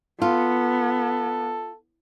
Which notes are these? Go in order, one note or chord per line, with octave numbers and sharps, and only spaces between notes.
B3 F4 A4